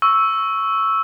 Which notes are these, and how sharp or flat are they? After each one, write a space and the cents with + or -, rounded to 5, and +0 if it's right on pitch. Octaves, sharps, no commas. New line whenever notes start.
C#6 +0 E6 +0